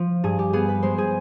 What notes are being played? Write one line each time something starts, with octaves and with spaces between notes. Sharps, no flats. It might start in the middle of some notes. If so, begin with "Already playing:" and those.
Already playing: F3
G2 G#4
G4
B3 G#4
B4
G#3 C5
G#4